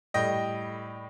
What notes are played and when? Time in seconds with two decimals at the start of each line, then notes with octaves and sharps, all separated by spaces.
0.14 A2 G3 D#5 G5